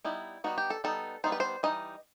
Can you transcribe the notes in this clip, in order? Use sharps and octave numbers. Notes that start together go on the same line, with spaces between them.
G3 B3 D#4 E4
G3 B3 D#4 F#4
G4
A4
G3 B3 D#4 A4
G3 B3 D#4 C5
B4
C5
E3 G3 D#4 D#5